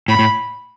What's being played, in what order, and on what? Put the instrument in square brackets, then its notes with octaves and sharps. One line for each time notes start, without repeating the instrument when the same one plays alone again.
[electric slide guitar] A2 [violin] B5
[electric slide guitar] A2